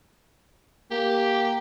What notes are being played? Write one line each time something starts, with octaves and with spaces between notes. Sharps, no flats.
A#3 G4